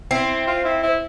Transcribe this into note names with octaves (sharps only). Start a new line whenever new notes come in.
C4 E4
F4
E4
E4